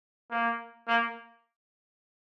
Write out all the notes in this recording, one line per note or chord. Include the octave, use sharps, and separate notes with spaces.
A#3
A#3